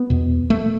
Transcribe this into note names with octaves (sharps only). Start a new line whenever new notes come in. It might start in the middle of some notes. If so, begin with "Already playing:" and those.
Already playing: B3
E2 B2
A3